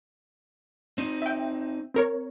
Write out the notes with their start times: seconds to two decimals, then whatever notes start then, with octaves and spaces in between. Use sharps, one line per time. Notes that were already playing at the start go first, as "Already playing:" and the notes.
0.98 C4 D#4
1.22 E5 G5
1.94 C4 A#4 C#5